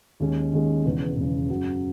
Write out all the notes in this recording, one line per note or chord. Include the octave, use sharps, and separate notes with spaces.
D#2 D#3 G#3 C#4
D#2 D#3 G#3 C#4
E1 E2 C#3
E1 E2 C#3
F#2 C#3 F#3